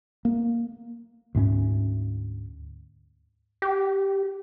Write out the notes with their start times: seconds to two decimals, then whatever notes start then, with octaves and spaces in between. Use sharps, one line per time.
0.25 A#3
1.35 D2 G#2 C4 C#4
3.62 G4